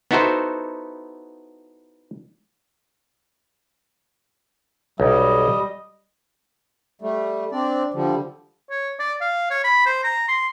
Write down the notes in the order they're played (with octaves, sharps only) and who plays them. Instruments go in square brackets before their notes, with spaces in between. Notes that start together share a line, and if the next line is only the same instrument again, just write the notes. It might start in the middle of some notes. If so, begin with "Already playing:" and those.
[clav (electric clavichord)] B3 D#4 E4 F#4 A4 C5
[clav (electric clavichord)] B1 [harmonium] G3 [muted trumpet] D#5
[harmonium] G3 A3
C4 D4 D5
D3 F3 G3
[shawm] C#5
D5
F5
C#5
B5
C5
A#5
C6